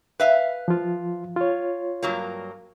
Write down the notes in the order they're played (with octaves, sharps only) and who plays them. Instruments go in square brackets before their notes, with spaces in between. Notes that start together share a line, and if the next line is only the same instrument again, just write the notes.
[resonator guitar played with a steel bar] B4 E5 F5
[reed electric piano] F3 F4
F4 C#5
[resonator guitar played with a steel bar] G2 F#3 A#3